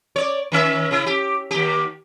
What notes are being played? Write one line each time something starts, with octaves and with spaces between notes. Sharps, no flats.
C#5 D5
D#3 C#4 E5
C#3 E4
G4
D#2 G4